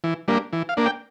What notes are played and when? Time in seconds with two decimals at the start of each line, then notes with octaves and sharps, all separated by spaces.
0.04 E3
0.28 G3 A#3 D4
0.53 E3
0.69 F5
0.77 A#3 D4
0.86 G5